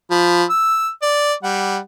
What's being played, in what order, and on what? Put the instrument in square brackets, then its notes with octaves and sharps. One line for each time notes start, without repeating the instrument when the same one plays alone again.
[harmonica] F3 B5
E6
D5
G3 F#5